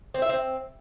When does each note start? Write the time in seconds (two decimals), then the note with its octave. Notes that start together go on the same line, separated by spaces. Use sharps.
0.14 C4
0.22 E5
0.29 C4